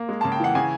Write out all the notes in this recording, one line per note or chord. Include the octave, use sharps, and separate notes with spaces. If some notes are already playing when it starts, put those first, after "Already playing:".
Already playing: A#3
G#3
C#3 A5
G5
E3 F#5
C#3 G#5